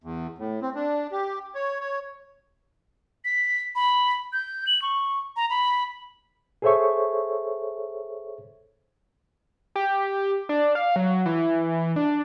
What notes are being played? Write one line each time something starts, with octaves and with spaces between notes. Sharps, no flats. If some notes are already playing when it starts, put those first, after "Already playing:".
E2
A2
C4
D4
G4
C#5
C#5
B6
B5
G6
F#7
C#6
A#5
B5
G#4 A4 C5 C#5 E5 C#6
G4
D4
F5
F#3
E3
D4